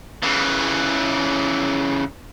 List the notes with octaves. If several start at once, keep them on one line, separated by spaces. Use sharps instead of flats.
C#3 E3